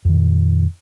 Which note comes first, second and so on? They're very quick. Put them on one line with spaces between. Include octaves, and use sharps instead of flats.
F2 D#3 A#2